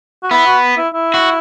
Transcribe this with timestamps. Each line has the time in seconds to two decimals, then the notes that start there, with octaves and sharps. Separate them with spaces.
0.23 F#4
0.31 B3 E4
0.46 F#4
0.77 E4
0.94 E4
1.14 F#4